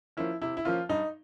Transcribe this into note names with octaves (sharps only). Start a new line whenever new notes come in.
F3 A#3 C#4 E4
C3 E4
E4
F3 A#3 C#4 F4
G2 D#4